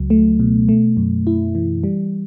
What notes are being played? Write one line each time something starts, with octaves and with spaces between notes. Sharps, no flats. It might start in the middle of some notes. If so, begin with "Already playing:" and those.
Already playing: C#2 F#3
A3
B2
A3
F#2
E4
E3
G3